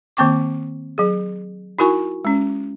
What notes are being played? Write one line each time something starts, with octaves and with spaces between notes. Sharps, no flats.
D#3 A#3 C4 G5 C#6 D6
F#3 G#4
D#4 E4 F#4 A#4 G#5 C#6
G#3 C#4